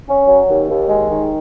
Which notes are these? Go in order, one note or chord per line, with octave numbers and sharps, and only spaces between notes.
C#4
F#3
D#2
D#2
G#3
D#3